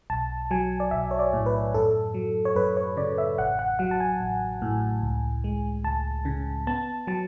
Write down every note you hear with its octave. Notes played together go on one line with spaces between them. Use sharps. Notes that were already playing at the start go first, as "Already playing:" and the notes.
B1 A5
F#3 G#5
D5
B1 E5
C#5
D5
A2
B4
F#2 A4
F#3
C#5
F#2 B4
C#5
C#3 D5
E5
A1 F#5
F#5
F#3 F#5
A5
G#5
A1
A2
C#2
G#3
C#2 A5
C#3
B3 A5
F#3 A5